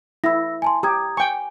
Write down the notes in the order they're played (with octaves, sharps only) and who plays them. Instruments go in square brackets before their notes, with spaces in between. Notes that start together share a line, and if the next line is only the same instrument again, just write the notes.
[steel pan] E4 [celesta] E6 A#6
[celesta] G#5 A5 C6
[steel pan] G4 [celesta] A#5 D#6 G#6
[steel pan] G5 C#6 [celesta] G#5